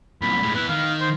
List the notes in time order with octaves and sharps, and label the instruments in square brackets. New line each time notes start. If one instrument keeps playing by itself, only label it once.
[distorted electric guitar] C2 A#2 [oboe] B5
[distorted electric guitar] A2 G#3
[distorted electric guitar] B3 E4 [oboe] B4
[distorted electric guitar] D#3 [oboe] F5
[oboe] C5